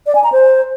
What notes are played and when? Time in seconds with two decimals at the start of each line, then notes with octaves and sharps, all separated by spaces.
0.07 D5
0.15 G#5
0.24 A#5
0.32 C5